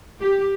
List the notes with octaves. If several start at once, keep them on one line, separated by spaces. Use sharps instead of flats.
G4